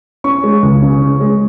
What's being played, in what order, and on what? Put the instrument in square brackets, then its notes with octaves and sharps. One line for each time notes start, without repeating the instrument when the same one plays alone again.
[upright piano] C#4 C#6
G#3
C#2
C#3
C#4
G#3